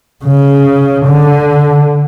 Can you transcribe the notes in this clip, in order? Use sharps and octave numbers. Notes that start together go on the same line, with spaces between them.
C#3
D3